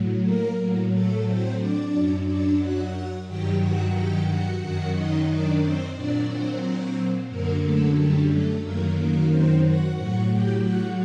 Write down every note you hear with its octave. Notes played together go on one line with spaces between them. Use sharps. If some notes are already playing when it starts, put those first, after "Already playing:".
Already playing: A2 F#3
A#3 A#4
A2 F#3
A3 A4
C4 C5
D4 D5
F#2 F#3
D4 D5
F#4 F#5
G2 D#3 F#3 G4 G5
F#4 F#5
G4 G5
F#4 F#5
F#2 D#3 F#3 F#4 F#5
D#4 D#5
D4 D5
C4 C5
A#2 F#3 D4 D5
C4 C5
F#2 D3 F#3 A#3 A#4
A3 A4
G3 G4
A3 A4
F#2 D#3 F#3 A#3 A#4
A#3 A#4
C4 C5
F#4 F#5
A2 F#3 F#4 F#5
G4 G5
F#4 F#5